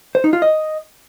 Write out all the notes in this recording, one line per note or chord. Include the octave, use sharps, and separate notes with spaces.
C5
D#4
F4
D#5